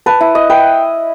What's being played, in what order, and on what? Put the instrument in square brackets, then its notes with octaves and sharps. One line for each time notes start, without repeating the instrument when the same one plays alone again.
[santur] B4 [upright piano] A5
[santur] E4
D#5
[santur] B4 [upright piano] G5